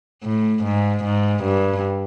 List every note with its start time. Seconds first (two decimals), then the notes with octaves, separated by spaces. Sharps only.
0.23 A2
0.64 G#2
1.04 G#2
1.43 G2